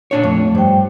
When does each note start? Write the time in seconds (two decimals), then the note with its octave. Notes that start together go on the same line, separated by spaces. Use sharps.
0.11 A#2 D4 C#5
0.23 F2 A3
0.55 G2 C5 G5